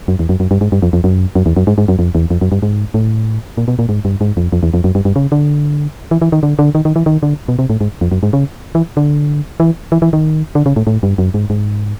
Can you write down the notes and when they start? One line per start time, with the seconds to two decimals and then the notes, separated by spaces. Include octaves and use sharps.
0.08 F#2
0.19 E2
0.29 F#2
0.40 F#2
0.51 G2
0.61 G#2
0.72 G2
0.82 F2
0.93 F2
1.04 F#2
1.35 F#2
1.46 E2
1.57 F#2
1.67 G#2
1.78 G#2
1.88 F#2
1.99 F2
2.15 E2
2.30 F2
2.41 F#2
2.52 G2
2.63 G#2
2.94 A2
3.57 A#2
3.68 B2
3.79 A#2
3.89 G#2
4.05 G2
4.21 G#2
4.37 F2
4.52 F2
4.63 E2
4.74 F2
4.84 F#2
4.95 G2
5.05 G2
5.16 C#3
5.32 D3
6.11 E3
6.22 E3
6.32 D#3
6.43 D3
6.59 D3
6.75 D#3
6.85 D#3
6.96 E3
7.06 D#3
7.23 D3
7.48 B2
7.59 C3
7.70 A2
7.81 G#2
8.01 F2
8.12 F#2
8.23 G#2
8.33 C#3
8.75 E3
8.97 D3
9.60 E3
9.92 E3
10.02 E3
10.13 D#3
10.55 D3
10.66 C#3
10.76 A2
10.87 A2
11.03 G2
11.18 F#2
11.34 G#2
11.50 G#2